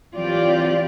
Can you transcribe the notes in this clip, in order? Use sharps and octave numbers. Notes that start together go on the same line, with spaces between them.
E3 F#3 C4 F4 G4 D5